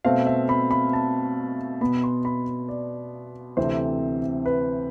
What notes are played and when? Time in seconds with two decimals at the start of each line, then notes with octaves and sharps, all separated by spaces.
0.05 B2 A3 C4 F5
0.27 E5
0.49 B5
0.71 B5
0.93 A5
1.81 B2 B3 B5
2.04 C6
2.25 B5
2.69 D5
3.57 D2 C3 E3 A3 C4 C5
4.46 B4